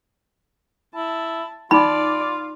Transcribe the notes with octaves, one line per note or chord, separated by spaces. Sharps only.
E4 A5
D#4 F4 D5 B5